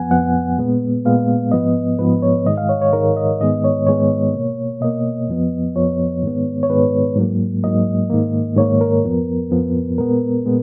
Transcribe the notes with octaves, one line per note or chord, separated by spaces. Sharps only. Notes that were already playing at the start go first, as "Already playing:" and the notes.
Already playing: F2 F3 B3 F#5 G#5
F2 F3 B3 F#5
A#2 G#3 B3
A#2 G#3 B3 F5
G#2 F3 B3 D#5
G#2 F3 B3 B4
C#5
G#2 D#3 G#3 D#5
F5
C#5
C#5
G#2 D#3 G#3 A#4
D#5
G#2 D#3 G#3 B3 D#5
C#5
G#2 D#3 G#3 B3 C#5
B2 A#3
B2 A#3 D#5
F2 F3 B3
F2 F3 B3 C#5
G#2 D#3 G#3 B3
C#5
G#2 D#3 G#3 B3 B4
G#2 F#3 A#3
G#2 F#3 A#3 D#5
G#2 D#3 A#3
G#2 D#3 A#3 C#5
A#4
F2 F3 B3
F2 F3 B3
A#2 G#3 B3 A#4
A#2 G#3 B3